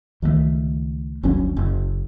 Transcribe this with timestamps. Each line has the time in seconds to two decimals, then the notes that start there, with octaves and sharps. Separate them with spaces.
0.22 C#2 D#3 G3 A3
1.23 G1 D2 F#3 C#4
1.57 F#1